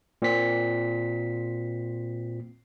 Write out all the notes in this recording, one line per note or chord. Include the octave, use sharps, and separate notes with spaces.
A#2 C4 B6